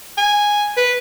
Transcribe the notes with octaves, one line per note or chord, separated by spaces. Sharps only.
G#5
B4